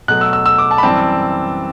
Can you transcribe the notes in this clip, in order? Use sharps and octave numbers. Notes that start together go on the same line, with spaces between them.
B2 F#3 A3 F#6
E6
E6
E6
D6
A5
B5
F#2 E3 G3 C4 A5